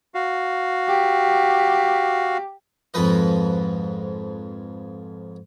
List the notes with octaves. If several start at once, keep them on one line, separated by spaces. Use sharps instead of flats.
F#4 F5
G4
F2 G#2 F3 B4 D#5